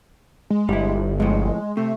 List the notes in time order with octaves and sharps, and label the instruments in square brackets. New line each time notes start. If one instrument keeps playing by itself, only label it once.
[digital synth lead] G#3
[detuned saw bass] G1 [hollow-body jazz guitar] G3 E4
[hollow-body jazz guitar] F2 A2 [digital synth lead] G#3
[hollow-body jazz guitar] C3 [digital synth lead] A3